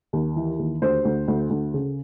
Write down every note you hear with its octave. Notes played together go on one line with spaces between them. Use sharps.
D#2
E3
D#2
D2 C5
D2
D2
D2
C#3